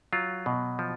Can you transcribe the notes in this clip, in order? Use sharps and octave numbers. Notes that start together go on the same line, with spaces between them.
F#3 F4
B2
F3